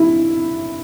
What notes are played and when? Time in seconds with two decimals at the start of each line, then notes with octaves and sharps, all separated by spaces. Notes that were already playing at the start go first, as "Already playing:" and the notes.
Already playing: E4